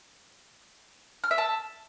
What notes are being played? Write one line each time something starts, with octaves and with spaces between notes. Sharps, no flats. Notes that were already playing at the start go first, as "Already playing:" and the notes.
F6
E5
A5